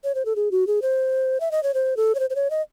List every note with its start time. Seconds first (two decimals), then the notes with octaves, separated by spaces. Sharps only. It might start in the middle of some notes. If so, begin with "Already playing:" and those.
0.04 C#5
0.15 C5
0.25 A4
0.36 G#4
0.51 F#4
0.67 G#4
0.82 C5
1.40 E5
1.51 D#5
1.63 C#5
1.74 C5
1.97 A4
2.15 C#5
2.20 C5
2.30 C5
2.35 C#5
2.50 D#5